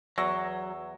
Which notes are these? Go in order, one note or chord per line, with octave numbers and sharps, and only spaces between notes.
E2 F#3 C#6 E6 A#6